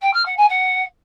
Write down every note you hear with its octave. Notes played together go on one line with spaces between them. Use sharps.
G5
F6
F#5
G#5
F#5